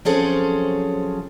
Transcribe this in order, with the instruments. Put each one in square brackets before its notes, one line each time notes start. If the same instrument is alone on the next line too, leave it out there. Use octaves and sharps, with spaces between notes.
[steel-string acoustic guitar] F3 F#3 C4 C#4 G#4 A4